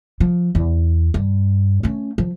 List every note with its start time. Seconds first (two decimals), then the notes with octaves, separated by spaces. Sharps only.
0.20 F3
0.55 E2
1.14 G2
1.83 A3 C#4
2.18 F3